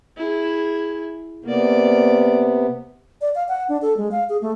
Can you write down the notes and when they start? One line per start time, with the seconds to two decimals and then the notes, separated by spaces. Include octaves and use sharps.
0.17 E4 G#4
1.44 C3 A#3 B3 D5
3.21 D5
3.35 F5
3.48 F#5
3.69 D4
3.82 A4
3.97 G#3
4.12 F5
4.29 G#4
4.42 A3